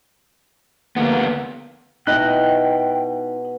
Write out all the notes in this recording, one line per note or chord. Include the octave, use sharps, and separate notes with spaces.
D2 A#3 B3
B2 D#4 E4 D#5 G5 B5 F#6